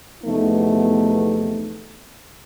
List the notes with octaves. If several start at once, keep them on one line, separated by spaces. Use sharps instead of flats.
E2 C3 F3 A3 B3 D#4